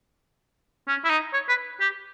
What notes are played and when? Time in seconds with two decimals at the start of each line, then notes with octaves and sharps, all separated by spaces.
0.88 C#4
1.04 E4
1.10 D#4
1.34 C#5
1.49 B4
1.80 G4